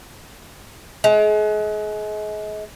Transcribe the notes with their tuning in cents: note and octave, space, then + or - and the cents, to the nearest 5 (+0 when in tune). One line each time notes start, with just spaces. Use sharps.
G#3 +35